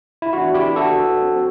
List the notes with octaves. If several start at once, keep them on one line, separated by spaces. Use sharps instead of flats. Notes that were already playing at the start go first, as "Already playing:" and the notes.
E4
A2 E3 B3 D4 F#4
E4 G4
F#4 A4
F#3 C4